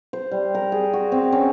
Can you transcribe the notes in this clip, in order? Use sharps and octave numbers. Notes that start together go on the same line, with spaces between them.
C5
G3
A#4
G#4
F#4
C4
C#4